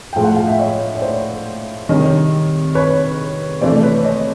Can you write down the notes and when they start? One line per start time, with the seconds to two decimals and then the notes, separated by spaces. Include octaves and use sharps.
0.13 A2 F3 G#3 G5
0.24 F#5
0.36 F5
0.48 E5
0.59 C#5 D#5
0.95 C#5
1.02 C5 D5
1.89 C3 D#3 G3 C#5 D#5
2.75 B4 C#5
3.61 C3 E3 A3 C5 D5
3.83 B4 C#5
4.05 C#5 D#5